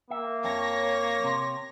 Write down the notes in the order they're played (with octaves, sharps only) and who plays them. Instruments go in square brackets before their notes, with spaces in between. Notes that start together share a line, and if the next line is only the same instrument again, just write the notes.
[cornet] A#3 [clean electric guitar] E5
[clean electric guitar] F2 [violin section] C#5 A#6
[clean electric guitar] C3